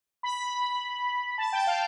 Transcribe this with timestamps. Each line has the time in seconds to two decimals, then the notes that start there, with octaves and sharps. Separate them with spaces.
0.23 B5
1.38 A5
1.53 G5
1.67 F5